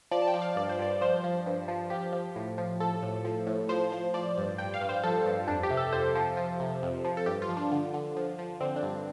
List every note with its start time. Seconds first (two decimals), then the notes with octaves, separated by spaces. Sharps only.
0.12 F3 D5
0.22 A5
0.27 G5
0.34 F3
0.42 F5
0.56 G2 D5
0.69 C5
0.79 G2 D5
1.01 F3 C5
1.24 F3
1.46 G2
1.68 F3
1.90 F3 G4
2.13 F3
2.36 A2
2.58 F3
2.80 F3 A4
3.03 A2
3.25 F3
3.47 A2
3.69 F3 C5
3.92 F3
4.14 F3 D5
4.37 G2
4.58 G2 G5
4.74 F5
4.81 G2
4.89 C5
5.04 F3 A4
5.26 G2
5.48 F2 D4
5.63 G4
5.71 C3
5.77 A4
5.93 F2 C5
6.15 F3
6.37 F3
6.60 C3
6.83 F2
7.05 F3
7.17 A4
7.26 G2 G4
7.42 F4
7.49 F3
7.57 D4
7.72 D3
7.94 D3
8.16 F3
8.39 F3
8.61 D3 C4
8.76 D4
8.83 G2